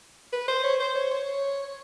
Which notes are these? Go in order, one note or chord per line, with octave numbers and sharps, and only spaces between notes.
B4
C5
C#5
C5
C#5
C#5